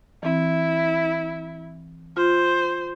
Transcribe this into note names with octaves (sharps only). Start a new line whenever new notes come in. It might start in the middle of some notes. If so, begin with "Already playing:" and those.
E3 C4 E4
F4 C5